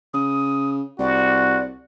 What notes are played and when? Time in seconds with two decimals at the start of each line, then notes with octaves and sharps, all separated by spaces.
0.14 C#3 D#6
0.99 C2 F#4 D5